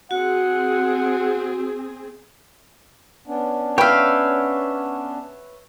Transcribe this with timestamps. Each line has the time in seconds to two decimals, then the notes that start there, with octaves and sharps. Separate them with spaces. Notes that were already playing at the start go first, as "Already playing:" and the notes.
0.11 C4 F#4 G#4 F#5
3.27 B3 C#4 D4
3.78 B4 C#5 E5 F5 G5